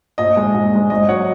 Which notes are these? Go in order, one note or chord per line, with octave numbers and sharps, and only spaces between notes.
A#1 D#5
G#2 G#3
A#1
G#2 G#3
G#1 D#5
F#3 C#5 F#5